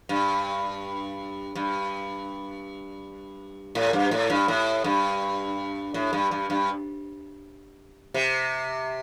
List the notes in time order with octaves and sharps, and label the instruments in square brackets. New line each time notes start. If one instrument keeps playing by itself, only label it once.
[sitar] G2
G2
A2
G2
A2
G2
A2
G2
A2
G2
G2
G2
C3